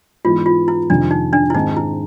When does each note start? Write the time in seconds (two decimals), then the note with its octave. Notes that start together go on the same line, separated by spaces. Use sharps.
0.25 G#2 E3 G#3 B3 F4
0.46 F4
0.68 E4
0.90 F2 C3 D#3 G#3 D4
1.11 D#4
1.33 D4
1.50 E4
1.54 G#2 D#3 G#3 C4 D#4
1.76 E4